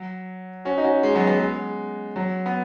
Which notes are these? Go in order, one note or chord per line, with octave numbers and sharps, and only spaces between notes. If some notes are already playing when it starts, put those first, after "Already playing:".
Already playing: F#3
C#4 F#4
D#4
C#4 F#4
G#3
F#3 B3
F#3 B3
G#3
F#3
B3